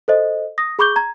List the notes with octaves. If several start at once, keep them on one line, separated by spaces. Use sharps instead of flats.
A4 C5 D#5
D#6 A#6
G#4 B5 C#6 D6 G6 G7
A#5 G#6